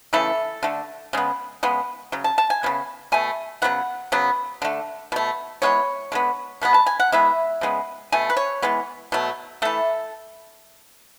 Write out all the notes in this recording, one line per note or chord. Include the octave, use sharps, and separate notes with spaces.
C#3 E3 A3 A4
D3 A3
C#3 G#3 B3
C#3 G#3 B3
C#3 F#3
A5
A5
G#5
C#3 G#3 B3
B2 A3 G#5
C#3 F#3 B3 F#5
C#3 F#3 B3
D3 A3
B2 A3
E3 G#3 B3 C#5
D3 G#3 B3
B2 G#3 B3 B4
A5
G#5
F#5
E3 G#3 B3 E5
C#3 G#3 B3
B2 A3 G#5
B4
C#5
E3 G#3 B3
B2 F#3 A3
E3 A3 A4